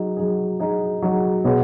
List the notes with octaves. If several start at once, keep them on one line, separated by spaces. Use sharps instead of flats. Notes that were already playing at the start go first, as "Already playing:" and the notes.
Already playing: F#3 D#4 G#4
F#3 D#4 G#4
F#3 D#4 G#4
F#3 D#4 G#4
B2 B3 G#4 C#5